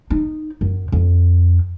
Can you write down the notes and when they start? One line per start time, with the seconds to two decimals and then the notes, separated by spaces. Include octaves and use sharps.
0.10 D#4
0.61 F#2
0.92 F2